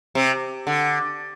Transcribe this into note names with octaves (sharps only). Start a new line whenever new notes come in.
C3
D3